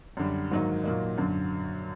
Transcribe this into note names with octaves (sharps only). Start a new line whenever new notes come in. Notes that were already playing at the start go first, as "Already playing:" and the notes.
F#2 D3 G3
G#2 D#3 F#3 A#3 D#4
A#2 F#3 A#3 D#4
F#2 D3 F#3